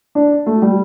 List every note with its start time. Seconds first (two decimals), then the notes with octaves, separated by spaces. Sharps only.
0.15 D4
0.46 A3
0.62 G3